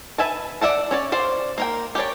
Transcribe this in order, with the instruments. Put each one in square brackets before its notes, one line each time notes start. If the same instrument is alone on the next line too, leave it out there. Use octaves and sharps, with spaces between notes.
[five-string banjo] B4 E5 G#5 A5
D5 E5 F#5 A5
C#4 C#5 D5
C5 D5 F5
A#3 A#4 G5
G4 A#4 C#5 D5